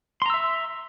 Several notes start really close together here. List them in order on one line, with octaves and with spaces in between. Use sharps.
C6 A#5 E6 E5